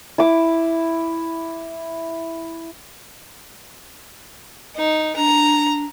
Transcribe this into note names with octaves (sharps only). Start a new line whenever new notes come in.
E4 D6
D#4
D4 A#5